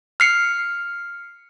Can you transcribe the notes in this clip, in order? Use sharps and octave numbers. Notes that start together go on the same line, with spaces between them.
F6 C7 C#7